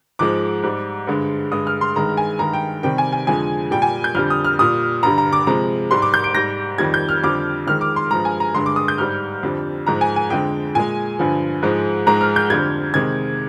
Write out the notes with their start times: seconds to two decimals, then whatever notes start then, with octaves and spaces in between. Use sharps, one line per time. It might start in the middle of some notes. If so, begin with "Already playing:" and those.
0.19 G#2 F3 G#3 D6
0.63 G#2 G3
1.07 G2 D3 G#3
1.51 G2 D3 G#3 D#6
1.67 F6
1.81 C6
1.95 G2 D#3 G#3 A#5
2.17 G#5
2.39 G2 D#3 G#3 A#5
2.53 G5
2.83 C3 D#3 G3 G5
2.98 G#5
3.12 G#5
3.27 F2 D3 F3 G#3 G#5
3.71 A#2 G3 G5
3.82 G#5
4.04 G6
4.15 F2 D3 G3 F6
4.30 D#6
4.45 F6
4.59 A#2 G3 D#6
5.03 G2 D3 G3 A#5
5.18 A#5
5.33 D6
5.47 C3 F3 G#3 A#5
5.91 G#2 G3 C6
6.02 D6
6.14 G6
6.24 D7
6.34 G#2 G3 A#6
6.78 F2 D#3 G3 G#6
6.94 G6
7.09 F6
7.24 F2 D3 G3 D6
7.67 F2 D#3 G#3 F6
7.81 D6
7.96 C6
8.11 G2 F3 G#3 A#5
8.25 G#5
8.40 A#5
8.54 G2 D3 G#3 C6
8.66 D6
8.76 D#6
8.88 G6
8.98 G#2 G3 F6
9.43 F2 D3 G3
9.87 G#2 F3 G#3 A#5
10.01 G#5
10.16 G#5
10.30 F2 D3 G#3 G5
10.75 A#2 G#3 G#5
11.19 G2 D3 F3
11.63 G#2 F3 G#3
12.07 G#2 F3 G#3 A#5
12.21 F6
12.36 G6
12.50 F2 D3 G3 G#6
12.94 C3 D#3 G#3 G#6